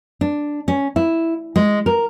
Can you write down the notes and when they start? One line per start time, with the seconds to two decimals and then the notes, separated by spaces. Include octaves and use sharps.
0.21 D4
0.68 C#4
0.96 E4
1.56 G#3
1.86 A#4